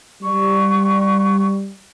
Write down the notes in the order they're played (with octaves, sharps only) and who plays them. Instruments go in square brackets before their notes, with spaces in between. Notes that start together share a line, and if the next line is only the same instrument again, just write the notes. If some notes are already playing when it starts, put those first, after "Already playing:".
[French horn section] G3 [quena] C#6